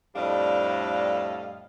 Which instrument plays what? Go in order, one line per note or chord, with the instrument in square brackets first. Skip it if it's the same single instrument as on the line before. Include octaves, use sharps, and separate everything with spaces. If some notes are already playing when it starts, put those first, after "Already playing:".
[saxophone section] F2 A2 G3 D4 D#5 F5